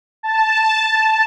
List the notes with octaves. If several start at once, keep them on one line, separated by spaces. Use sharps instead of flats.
A5